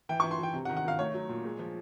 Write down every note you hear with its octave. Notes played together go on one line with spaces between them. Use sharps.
E3 G5
E3 C#6
C6
E3 G5
C3
F#5
D#3
F#5
D#3 F5
A3 C#5
F#3
A#2
G#3
F3